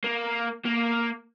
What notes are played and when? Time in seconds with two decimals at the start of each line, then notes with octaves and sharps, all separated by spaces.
0.04 A#3
0.66 A#3